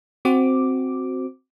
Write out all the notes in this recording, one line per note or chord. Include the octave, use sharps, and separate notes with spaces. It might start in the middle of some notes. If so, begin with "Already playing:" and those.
C4 F#4 D6